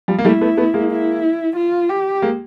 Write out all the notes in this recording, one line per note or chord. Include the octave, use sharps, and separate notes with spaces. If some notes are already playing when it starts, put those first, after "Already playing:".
F3 G3
A#3
G3 A3 E4
A3 B3
A3 B3
G#3 A#3
E4
F4
G4
G#3 A#3